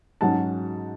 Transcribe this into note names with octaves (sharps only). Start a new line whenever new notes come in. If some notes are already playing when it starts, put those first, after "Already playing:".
G#2 F#3 C#4 F#5 A5